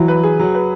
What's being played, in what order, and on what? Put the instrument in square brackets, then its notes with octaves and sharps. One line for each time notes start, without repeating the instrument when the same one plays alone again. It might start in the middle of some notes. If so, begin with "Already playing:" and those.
Already playing: [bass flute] E3 [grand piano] F#3
[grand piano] B4
G#4
F#3
B4